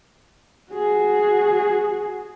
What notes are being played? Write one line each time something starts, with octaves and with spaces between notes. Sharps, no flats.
F#4 G#4